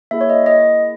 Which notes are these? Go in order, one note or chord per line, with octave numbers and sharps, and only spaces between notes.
A#3 E4 G#4 E5
C#5
D#5
D#5